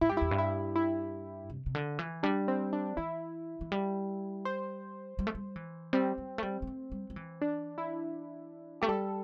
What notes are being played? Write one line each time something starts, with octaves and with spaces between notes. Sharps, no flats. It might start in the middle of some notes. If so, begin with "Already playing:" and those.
A2 E4
G2 G4
E4
E2
G2
E4
E4
C3
C3
D3
E3
G3 D4
C4
D4
E3 E4
E3
G3
C5
G3
A3
G3
E3
G3 C4
G3
A3
G3
G3
A3
G3
G3
E3
D4
E4
A3 G4
G3 A4